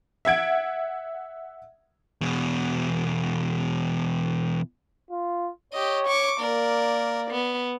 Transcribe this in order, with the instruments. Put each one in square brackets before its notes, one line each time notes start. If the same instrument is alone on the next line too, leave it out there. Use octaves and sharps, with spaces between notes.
[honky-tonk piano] E5 F#5 G#6 D7
[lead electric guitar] E2 B2
[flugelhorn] F4
[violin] G4 D#5 [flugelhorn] C#5
[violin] C#6 D6
[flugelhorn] A#3 [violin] A#4 D5
[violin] B3